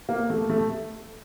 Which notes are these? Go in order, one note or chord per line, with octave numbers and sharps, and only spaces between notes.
A#3
A3
A3